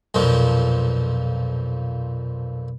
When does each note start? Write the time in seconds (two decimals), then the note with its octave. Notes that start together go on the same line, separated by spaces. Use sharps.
0.14 B1 F2 A#2 F3